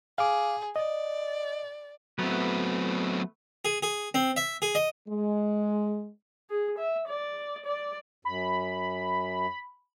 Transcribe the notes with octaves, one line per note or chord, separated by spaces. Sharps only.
G#4 F5 D6
D5 D#5
F#3 A3 B3 C4 B4
G#4
G#4
C4
E5
G#4
D#5
G#3
G#4
E5
D5
D5
F#2 B5